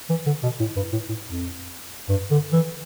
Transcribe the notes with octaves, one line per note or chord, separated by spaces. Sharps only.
E3
D3
B2
A2
G2
A2
A2
F2
G2
D3
E3